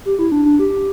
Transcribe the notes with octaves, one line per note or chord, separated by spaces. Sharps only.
G4
E4
D4
D4
G4